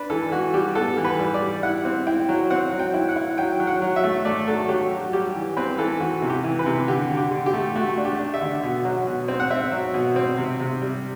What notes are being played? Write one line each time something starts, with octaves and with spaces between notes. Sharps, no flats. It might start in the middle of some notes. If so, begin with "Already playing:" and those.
Already playing: D4 B4
E3 A4
E3 F#4
G3 G4
B3 A4
E3
B4
G3
D5
G3
E4 F#5
C4
E4 G5
F#3
C4 F#5
F#3
G5
E4
F#5
E4
F#3 G5
F#3
F#5
F#3
E5
A3
A3 D5
F#3 A4
F#3 G4
F#3
G3 G4
E3
C4 B4
E3 A4
E3 F#4
C3
G4
E3
B4
C3
D3 G4
D3
G4
D3
G4
A3
A3 F#4
D4
G4
D4
E5
D3
B2
F#3
B2
C4
F#5
C4 E5
F#3
B2
C4
C3
C3
G3